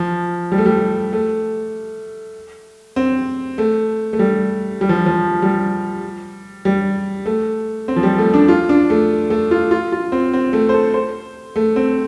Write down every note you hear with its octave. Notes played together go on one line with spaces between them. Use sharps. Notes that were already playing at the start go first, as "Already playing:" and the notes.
Already playing: F3
G3
A3
G3
A3
C4
A3
A3
G3
G3
F3
F3
G3
G3
A3
C4
F3
G3
A3
D4
F4
D4
A3
A3
F4
F4
F4
C4
C4
A3
C5
A4
C5
A3
C4